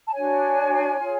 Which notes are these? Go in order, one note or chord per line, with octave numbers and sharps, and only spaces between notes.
A5
D4 F#4 C#5 G#5
F4 G#4 C#5